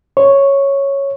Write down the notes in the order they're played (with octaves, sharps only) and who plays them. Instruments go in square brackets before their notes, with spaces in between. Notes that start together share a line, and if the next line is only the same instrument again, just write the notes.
[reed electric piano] C#5